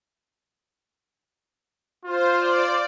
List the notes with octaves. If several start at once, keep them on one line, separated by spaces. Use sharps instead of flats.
F4 C5
D5